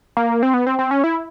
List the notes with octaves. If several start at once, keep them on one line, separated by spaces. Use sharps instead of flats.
A#3
C4
B3
C4
C4
C#4
E4